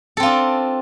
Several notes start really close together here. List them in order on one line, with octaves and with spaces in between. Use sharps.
A4 C4 F4 D4